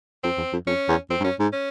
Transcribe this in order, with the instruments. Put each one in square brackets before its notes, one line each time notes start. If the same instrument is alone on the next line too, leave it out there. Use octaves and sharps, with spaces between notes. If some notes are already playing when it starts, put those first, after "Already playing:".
[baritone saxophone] F2 [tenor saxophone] C4
[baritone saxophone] E2
F2
[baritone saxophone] F2 [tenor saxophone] C#4
[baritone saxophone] E2
[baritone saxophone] F2 [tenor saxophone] C4
[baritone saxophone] G2
[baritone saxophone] F#2 [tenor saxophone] C#4
[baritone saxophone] G#2
[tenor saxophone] C#4